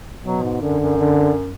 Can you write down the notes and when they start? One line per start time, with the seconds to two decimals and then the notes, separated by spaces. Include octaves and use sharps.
0.24 B2 F#3
0.43 G#2
0.61 F#2 D3
0.80 F#2
0.98 D3